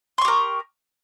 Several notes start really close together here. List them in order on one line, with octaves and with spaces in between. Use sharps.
C6 C#6 G4 A#4